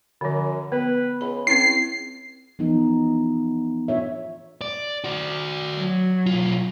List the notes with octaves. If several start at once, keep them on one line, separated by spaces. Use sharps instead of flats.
F#2 D3 F3
B3 B4
C#2 B5
C4 C#4 E4 C7
E3 F3 B3 D#4
D4 F4 C#5 E5
D5
F#4 D5
F#3
B1 F4